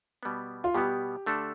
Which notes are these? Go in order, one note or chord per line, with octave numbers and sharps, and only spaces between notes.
B2 G3 B3
F4
B2 G3 B3 G4
D3 A3 D4 A4